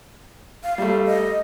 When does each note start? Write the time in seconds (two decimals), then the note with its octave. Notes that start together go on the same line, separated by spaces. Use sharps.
0.64 F5
0.78 G3 A3 F5
1.06 D#5